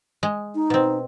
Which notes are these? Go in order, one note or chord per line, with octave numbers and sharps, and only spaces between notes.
G#3
D#4
B2 C4